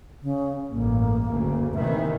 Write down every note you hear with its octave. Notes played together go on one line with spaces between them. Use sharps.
C#3
A1 G2 A#3
F#1 D2 C#3
C3 D#3 E3 E5